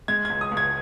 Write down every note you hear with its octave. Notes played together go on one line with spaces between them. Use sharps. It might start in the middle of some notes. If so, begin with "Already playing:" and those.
G#3 G#6
C#2 G#6
D#6
C#2
G#6